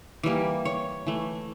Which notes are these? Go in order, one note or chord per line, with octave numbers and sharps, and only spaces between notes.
E3 G3 A#3
C#5
E3 A3